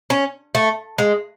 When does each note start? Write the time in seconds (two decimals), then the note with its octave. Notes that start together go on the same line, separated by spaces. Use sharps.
0.10 C#4
0.55 A3
0.98 G#3